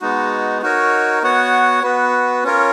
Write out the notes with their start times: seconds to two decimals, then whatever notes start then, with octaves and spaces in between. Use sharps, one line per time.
0.01 G#3 B3 D#4 F#4
0.62 D#4 F#4 A#4 C#5
1.23 B3 F#4 C#5 F#5
1.83 B3 F#4 B4
2.44 C#4 F4 A#4 C#5